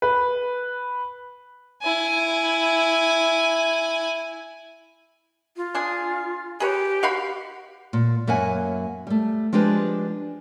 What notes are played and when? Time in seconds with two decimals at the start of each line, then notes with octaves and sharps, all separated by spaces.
0.02 B4
1.82 E4 G#5
5.57 F4
5.74 D4 G#4
6.60 G4 G#4 B4 C#5
7.03 F#4 F5 B5
7.93 A#2
8.27 F#2 A#3 E5 F#5 G#5
9.07 G3 A3
9.53 F3 G#3 D4 G4 B4